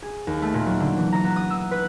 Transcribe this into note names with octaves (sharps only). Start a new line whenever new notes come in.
G#4
D#2
A3
A#2
F#3
D3
E3
A#5
B3
D#6
E6
B4